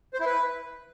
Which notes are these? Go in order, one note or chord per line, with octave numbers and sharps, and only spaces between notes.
C5
E4
B4